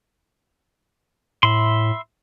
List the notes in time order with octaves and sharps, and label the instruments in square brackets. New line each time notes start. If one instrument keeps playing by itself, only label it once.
[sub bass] A2 [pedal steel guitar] E5 B5 C6